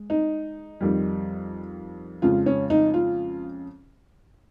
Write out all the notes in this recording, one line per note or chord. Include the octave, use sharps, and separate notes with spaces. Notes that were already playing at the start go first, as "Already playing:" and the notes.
Already playing: G#3
D#4
F2 D#3 G3
F2 C#3 F3 G#3 F4
C#4
D#4
F4